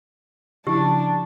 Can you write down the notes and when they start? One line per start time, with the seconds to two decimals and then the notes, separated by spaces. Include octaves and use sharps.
0.67 C#3 F3 D4 E4 G4